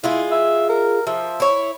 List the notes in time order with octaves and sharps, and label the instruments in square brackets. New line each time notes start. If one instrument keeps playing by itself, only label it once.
[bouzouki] G#3 F4 G#4 [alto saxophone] E4
[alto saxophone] E5
A#4
[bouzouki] F3 [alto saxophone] E5
[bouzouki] E4 C#5